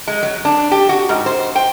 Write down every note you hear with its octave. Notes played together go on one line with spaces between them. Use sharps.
G#3
F#3
D4
G4
F#4
G#2
C5
G5